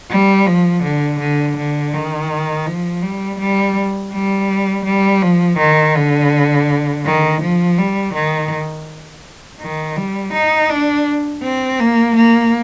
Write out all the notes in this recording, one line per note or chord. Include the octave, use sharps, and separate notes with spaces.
G3
F3
D3
D3
D3
D#3
F3
G3
G3
G3
G3
F3
D#3
D3
D#3
F3
G3
D#3
D#3
G3
D#4
D4
C4
A#3
A#3